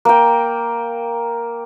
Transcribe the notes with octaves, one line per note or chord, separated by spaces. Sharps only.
A#3 G5